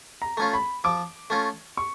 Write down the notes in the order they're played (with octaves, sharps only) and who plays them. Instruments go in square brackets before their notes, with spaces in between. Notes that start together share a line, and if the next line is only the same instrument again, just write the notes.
[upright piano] A#5
[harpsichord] A3 C#4 F4
[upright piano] B5
[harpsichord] F3 [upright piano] D6
[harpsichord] A3 C#4 F4
[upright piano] C#6